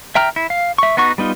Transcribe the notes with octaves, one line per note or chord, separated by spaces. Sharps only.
E5 G5 A#5 F6
E4
F5
E5 C#6
B3 D#4 F#4 C#6
G3 B3 D#4 F4